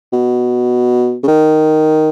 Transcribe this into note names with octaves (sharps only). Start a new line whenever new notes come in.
B2
C#3
D#3